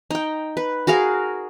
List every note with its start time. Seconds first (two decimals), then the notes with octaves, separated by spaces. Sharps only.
0.11 D#4 G5
0.57 B4
0.87 F#4 G#4 A#4 F5